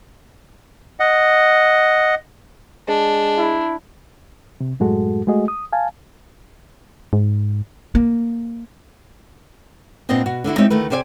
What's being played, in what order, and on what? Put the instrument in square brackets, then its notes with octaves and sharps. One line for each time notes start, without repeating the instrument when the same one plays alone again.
[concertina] D#5 F#5
[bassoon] G#3 [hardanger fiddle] D4
[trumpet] E4
[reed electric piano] C3
F#2 A2 G#3 F#4 A4
G#3 A3 F#4 G#4 D#5
D#6
F5 G#5 A5
[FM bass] G#2
[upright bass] A#3
[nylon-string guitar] A#2 B3 C4 D4 D#5 G5
B2 F#4
D3 D4 E4 F#4
G#3 C4 D#4 G4 C#5 E5
D2 D#3 A3 B4
C3 G4 C5 D5 D#5 G#5